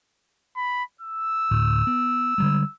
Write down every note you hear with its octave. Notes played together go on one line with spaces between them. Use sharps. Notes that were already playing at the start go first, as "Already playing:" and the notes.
B5
E6
D2 A2
B3
D3 G3 G#3